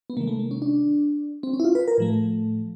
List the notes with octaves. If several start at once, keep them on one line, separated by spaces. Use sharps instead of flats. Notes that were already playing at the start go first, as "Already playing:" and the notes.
B3
C3 D#3 G#3 A#3
A3
A#3
C#4
D4
C4
C#4
E4
F4
B4
A#4
A2 F3 A3